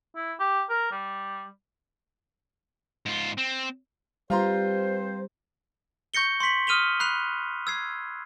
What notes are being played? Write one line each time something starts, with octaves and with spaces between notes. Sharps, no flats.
E4
G4
A#4
G3
G#2 F4
C4
G3 C4 F4 B4 C5 A#5 C6
C#6 G6 A#6 C#7 G7
C6 C#6 B6 F#7
D#6 F6 D#7 F7 G7
B5 F#6 C7 F7
E6 G#6 C7